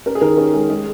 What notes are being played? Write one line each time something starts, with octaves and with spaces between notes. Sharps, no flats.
C#4 A#4
G#4
D#3 A#4
C#4 A#4
G#3 G#4
G#3 G#4